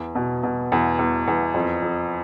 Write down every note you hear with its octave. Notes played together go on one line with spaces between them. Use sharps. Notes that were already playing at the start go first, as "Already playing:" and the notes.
Already playing: E2
B2
B2
E2
E2
E2
F2
F2